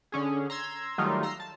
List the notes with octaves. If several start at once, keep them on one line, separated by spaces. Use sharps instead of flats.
D3 C#4 G#4
A#5 C6 E6 G#6
D#3 F#3 G3 A3 D#4 F4
A#5 C6 E6 C7
A5